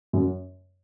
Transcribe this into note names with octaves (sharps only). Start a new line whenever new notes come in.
F#2